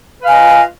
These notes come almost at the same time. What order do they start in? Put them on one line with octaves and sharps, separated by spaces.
B4 F5 G#5 D#5 F4